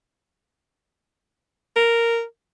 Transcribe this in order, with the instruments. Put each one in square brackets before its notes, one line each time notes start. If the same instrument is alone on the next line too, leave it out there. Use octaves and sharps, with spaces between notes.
[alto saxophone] A#4